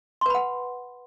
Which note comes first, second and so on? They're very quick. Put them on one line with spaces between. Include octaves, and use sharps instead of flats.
C6 B4 B5 F#5